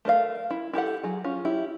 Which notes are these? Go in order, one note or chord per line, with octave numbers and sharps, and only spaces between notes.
A3 A#4 C5 F5
E4
E4 G4 A4 F#5
F#3 G#4
C#4 F4
E4 G4